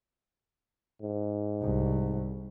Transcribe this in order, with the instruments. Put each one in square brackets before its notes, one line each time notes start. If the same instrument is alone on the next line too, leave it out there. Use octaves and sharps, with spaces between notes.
[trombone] G#2
[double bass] C2